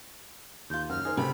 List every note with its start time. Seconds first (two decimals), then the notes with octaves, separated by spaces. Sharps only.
0.70 D#2 F4 G6
0.89 F#2 F6
1.05 D#4 G#4 A#4 C5
1.17 C#2 C3 A3 B4 B5